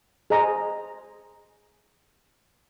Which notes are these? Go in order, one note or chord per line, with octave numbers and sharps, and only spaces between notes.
G#4 C5 D#5 A#5